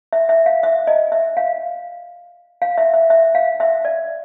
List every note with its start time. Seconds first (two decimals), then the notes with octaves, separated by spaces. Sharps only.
0.13 E5
0.29 E5
0.46 F5
0.63 E5
0.87 D#5
1.12 E5
1.37 F5
2.62 F5
2.78 E5
2.94 E5
3.10 E5
3.35 F5
3.60 E5
3.85 D5